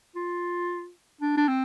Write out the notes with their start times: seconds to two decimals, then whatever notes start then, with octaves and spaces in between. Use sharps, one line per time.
0.15 F4
1.21 D4
1.37 D4
1.48 C4